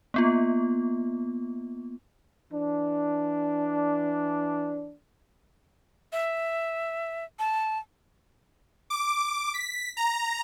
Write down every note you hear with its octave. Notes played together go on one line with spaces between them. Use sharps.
A#3 B3 F4
E3 D4
E5
A5
D6
B6
A#5